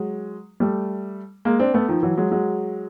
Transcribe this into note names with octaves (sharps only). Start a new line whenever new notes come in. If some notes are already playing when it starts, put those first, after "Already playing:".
Already playing: F#3 G#3
G3 A3
G#3 A#3
C4 D4
A3 B3
D#3 F3
E3 F#3
F#3 G#3
F#3 G#3